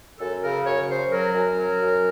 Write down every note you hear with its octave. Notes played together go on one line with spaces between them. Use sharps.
F#2 A4
C#3 A#4
F#2 C#5
C#3 C5
F#3 A#4
F#2
F#3
F#2